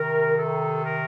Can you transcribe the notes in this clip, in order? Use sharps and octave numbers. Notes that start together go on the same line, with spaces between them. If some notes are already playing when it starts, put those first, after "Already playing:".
Already playing: C3 D#3 A#4
A4
A#4